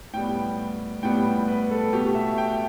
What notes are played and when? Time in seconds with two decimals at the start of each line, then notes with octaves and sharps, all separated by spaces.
0.14 A2 G3 B3 G5
1.03 A2 G3 B3 G5
1.48 B4
1.71 A4
1.93 B2 A3 G4
2.15 E5
2.38 G5